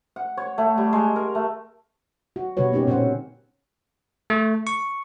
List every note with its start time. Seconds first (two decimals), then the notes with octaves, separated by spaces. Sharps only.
0.16 F#5
0.37 C#5
0.58 A3
0.78 G3
0.93 G#3
1.16 A#4
1.35 A3
2.36 F#4
2.57 B2 D3 G3 F#4 B4 C#5
2.72 A#3 C#4 D#4 G4 A#4
2.87 A#2 C4 C#4 C5 F#5
4.30 A3
4.67 C#6